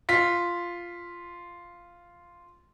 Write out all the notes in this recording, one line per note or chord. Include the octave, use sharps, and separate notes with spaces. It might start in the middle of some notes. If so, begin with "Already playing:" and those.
F4 B6